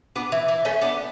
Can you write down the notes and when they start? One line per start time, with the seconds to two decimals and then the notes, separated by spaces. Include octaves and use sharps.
0.16 B3 D4
0.32 E3
0.48 E3
0.65 A3 C#4
0.81 B3 D4